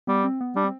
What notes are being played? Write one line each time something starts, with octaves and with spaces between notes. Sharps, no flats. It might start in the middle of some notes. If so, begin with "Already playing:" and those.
G3 B3
C4
B3
G3 D4
C4